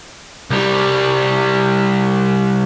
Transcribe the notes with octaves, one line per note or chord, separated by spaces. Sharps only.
C2 G3